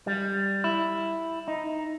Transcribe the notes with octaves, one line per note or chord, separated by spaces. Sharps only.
G3
E4
D#4